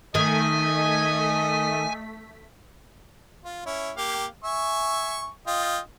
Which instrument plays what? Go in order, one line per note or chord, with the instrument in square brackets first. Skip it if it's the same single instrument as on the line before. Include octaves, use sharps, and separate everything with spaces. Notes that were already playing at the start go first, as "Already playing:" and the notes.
[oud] D#3 [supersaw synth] A3 B6 [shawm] D#5 [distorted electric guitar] G#5
[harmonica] F4
C#4 E4
A#3 G4 F5
E5 G#5 C#6
F4 D#5 G5